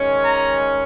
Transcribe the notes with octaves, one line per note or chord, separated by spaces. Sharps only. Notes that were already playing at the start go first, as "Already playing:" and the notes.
Already playing: D#3 G#3 C#4
A#5